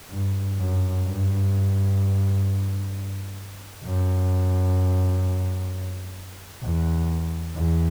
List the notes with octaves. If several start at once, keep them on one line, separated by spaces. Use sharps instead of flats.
G2
F#2
G2
F#2
E2
E2